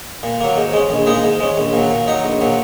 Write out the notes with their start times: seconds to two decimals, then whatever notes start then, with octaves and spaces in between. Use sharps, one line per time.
0.23 A#2
0.41 F#3 A#3
0.57 G#2
0.74 G#3 C#4
0.90 A#1
1.06 A#2 G#3 D#4
1.24 G#2
1.40 G#3 C#4
1.58 A#1
1.73 A#2 F#3
1.91 A#2
2.08 F#3 D#4
2.24 A#1
2.41 A#2 F#3